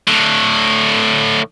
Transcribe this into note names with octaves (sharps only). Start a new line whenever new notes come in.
A2 D3